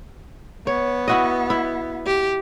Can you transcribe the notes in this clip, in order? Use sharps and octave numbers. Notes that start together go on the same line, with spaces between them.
B3 C#5
E4 F#4 D#5
E4
G4